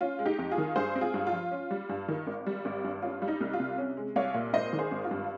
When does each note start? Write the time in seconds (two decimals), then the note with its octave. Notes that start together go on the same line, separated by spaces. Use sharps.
0.01 C#4 F4
0.19 G#3
0.26 D#4 G4
0.39 F2
0.51 F4 G#4
0.58 D#3
0.76 G2 G#4 C5
0.95 C4
1.01 F4 G#4
1.14 G2
1.27 F4
1.32 F3
1.51 C#4
1.71 G3
1.89 G2
2.08 D#3
2.27 G#1
2.46 G3
2.65 G#1
2.84 G2
3.02 C#4 F4
3.22 G3
3.28 D#4
3.41 C2
3.53 F4
3.60 C3
3.78 C#4
3.97 G#3
4.16 C2 C#5 F5
4.34 A#2
4.53 G#1 C5 D#5
4.73 D#3
4.79 G#4 C5
4.91 G#1
5.04 F4
5.11 G2